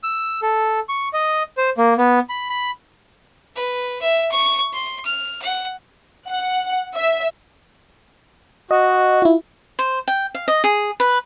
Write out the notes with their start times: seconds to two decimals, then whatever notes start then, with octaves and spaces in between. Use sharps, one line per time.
0.03 E6
0.42 A4
0.89 C#6
1.13 D#5
1.57 C5
1.78 A#3
1.98 B3
2.29 B5
2.50 B5
3.55 B4
4.01 E5
4.31 C#6
4.72 C6
5.05 F6
5.42 F#5
6.28 F#5
6.95 E5
8.71 F#4 D#5
9.22 E4 F4
9.79 C5
10.08 G5
10.35 F5
10.48 D#5
10.64 G#4
11.00 B4